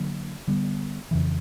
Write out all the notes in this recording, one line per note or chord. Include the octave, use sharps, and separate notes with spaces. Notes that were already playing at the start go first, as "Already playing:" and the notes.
Already playing: D3 F#3 A#3 D4
D3 G3 B3
F2 C#3 E3